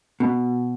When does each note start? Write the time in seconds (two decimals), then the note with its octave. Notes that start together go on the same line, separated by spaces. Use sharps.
0.20 B2